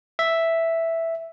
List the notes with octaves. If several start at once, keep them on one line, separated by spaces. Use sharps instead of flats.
E5